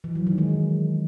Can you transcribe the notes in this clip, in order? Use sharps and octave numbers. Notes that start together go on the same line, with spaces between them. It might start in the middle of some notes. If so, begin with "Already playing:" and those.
E3
F#3
D#3
G#3